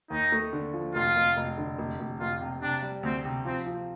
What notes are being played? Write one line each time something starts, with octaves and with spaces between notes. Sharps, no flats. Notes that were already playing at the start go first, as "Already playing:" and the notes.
D#2 D#4
A3
D3
F3
F1 F4
F1
F1
D3
F1
F1
F1 F4
C3
C3 D4
G3
D2 C4
C3
F3 C4
F3